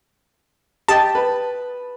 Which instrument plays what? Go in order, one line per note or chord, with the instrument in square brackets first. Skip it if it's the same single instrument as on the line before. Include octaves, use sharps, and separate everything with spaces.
[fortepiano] G4 D#5 G5 [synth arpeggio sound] A5
[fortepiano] B4